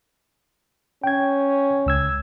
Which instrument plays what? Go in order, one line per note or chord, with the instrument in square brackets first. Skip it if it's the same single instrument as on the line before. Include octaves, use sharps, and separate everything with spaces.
[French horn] C#4 [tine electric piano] G5 G#6
[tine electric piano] C#2 E6 G#6